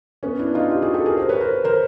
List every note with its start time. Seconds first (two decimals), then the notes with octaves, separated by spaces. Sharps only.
0.23 B3 C#4
0.39 D4 E4
0.54 D#4 F4
0.70 F4 G4
0.82 F#4 G#4
0.94 G4 A4
1.05 G#4 A#4
1.17 A#4 C5
1.29 B4 C#5
1.40 A#4 C5
1.64 A#4 C5